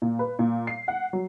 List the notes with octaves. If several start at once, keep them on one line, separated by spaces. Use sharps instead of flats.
A#2
B4
A#2
C7
F#5
F#3